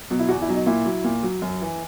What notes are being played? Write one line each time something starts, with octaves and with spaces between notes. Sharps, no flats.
B2 F#3
E4
E2 F#4
E4
B2 F#3
D#4
A#2 E4
F#3
A#2
F#3
F#2
E3